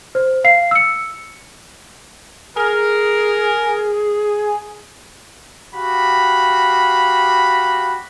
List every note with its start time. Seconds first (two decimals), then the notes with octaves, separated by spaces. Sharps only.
0.15 C5
0.44 F5 C7
0.71 E6 C#7
2.56 G#4 A#4
5.75 F#4 G4 F5 B5